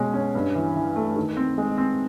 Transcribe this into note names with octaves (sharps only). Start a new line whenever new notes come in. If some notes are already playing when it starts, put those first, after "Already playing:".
Already playing: B2 G#3 C#4
C#4
G2
E3
E3
A3
D#3
C4
G#3
C4